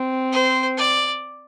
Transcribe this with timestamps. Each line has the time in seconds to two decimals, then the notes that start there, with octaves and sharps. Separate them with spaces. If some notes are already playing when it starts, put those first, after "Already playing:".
Already playing: C4
0.32 C5
0.77 D5